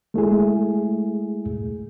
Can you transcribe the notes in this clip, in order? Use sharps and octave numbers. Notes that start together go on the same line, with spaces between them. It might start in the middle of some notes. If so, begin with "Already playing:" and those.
G#3 A3 E4 G#4